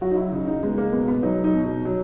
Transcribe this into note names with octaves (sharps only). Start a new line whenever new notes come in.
F#3 F#4
D#4
E4
C#3 D#4
D#4
G#3 B3
A#3
B2 B3
B3
F#3 D#4
D#4
B2
D#4
F#3